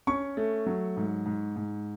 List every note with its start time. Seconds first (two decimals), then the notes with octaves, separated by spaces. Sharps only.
0.07 C#4 C#6
0.37 A3
0.66 F#3
0.97 G#2
1.26 G#2
1.56 G#2